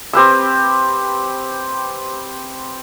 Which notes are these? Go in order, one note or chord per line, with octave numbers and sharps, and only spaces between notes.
C4 G4 B4 E6